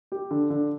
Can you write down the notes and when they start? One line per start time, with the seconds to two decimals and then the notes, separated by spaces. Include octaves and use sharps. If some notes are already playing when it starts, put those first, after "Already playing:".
0.12 G4
0.31 D3
0.50 D3